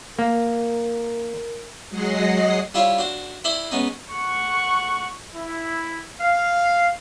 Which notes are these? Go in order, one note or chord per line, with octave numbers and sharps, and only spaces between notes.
A#3 A#4
F#3 G#3 D#5 F#5 A#6 C7
G3 E4 F4 C#5 E5 F5
D4 F#4 C5
E4 C5 D5 B5 C6
G#3 B3 C#4 D#4
F#5 C#6
E4
F5